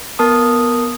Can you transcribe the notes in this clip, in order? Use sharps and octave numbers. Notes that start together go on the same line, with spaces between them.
B3 A#4 A5 D#6